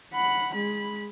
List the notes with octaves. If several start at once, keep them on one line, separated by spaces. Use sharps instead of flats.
F#5 B5
G#3 B5